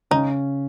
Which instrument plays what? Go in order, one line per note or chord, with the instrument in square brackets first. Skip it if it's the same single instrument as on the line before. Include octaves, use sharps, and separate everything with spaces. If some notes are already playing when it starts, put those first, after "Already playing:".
[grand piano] C#3 C#4 [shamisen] D#4